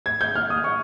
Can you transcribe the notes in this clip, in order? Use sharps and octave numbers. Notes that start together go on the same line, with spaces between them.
G#6
G6
F6
D#6
C#6